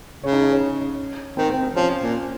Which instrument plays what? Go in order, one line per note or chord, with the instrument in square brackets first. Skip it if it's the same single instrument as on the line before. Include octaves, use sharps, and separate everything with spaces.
[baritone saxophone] C#3 [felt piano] C#5
[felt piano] D#4
D#4
C#4
[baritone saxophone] D#3 [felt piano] C4
[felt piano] C4
C4
[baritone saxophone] F3 [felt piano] C#4
[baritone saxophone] A#2